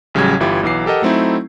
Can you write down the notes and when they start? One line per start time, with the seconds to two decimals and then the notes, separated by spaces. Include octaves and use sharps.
0.14 A1 C#3 F#3 G3 G#6
0.40 G1 E3 E4 F4 G4
0.63 B1 E3 F#3 D6 C7
0.86 G4 A4 A#4 D#5 F#5
1.02 F#3 A3 C4 D#4 E4